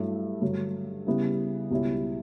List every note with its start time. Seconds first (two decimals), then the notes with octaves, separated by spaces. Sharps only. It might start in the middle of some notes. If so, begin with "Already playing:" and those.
Already playing: G2 F#3 A3 E4
0.42 G2 D3 F#3 A3
1.07 C#3 G3 B3 E4
1.71 C#2 B2 G3 C#4 E4